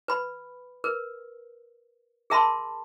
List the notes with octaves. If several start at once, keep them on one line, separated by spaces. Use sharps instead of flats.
B4 B5
A#4 B4
G#4 A#4 E5 A5 B5 C6